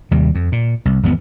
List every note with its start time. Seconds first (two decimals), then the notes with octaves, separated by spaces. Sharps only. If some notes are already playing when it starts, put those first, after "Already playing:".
0.11 D#2 C3 G3
0.35 F2
0.52 A#2
0.85 C2
1.03 G#1 E2 F3 B3